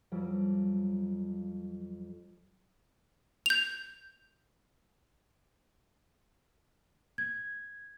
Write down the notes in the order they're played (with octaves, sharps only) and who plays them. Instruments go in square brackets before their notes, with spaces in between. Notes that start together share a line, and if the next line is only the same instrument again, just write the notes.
[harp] F2 F#3 G3
[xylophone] G6 F7
[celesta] G#6